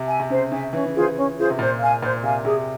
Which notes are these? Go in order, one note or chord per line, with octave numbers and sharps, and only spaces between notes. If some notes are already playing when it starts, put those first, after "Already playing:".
Already playing: C3
E5 G#5
C3
C#3 C5
C#3 E5 G#5
E3 C#4
C#3
E3 F4 G#4 C5
C#4
F4 G#4 C5
C3
A#2 C5
F5 G#5
A#2 C5
C3 F5 G#5
C3 G#4